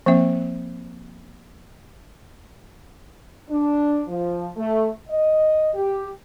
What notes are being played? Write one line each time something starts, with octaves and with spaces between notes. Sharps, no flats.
F3 A#3 C4 E5
D4
F3
A3
D#5
G4